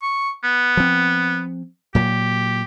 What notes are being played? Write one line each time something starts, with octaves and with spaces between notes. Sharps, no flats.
C#6
B3
F3 C4
A#2 F#3 G4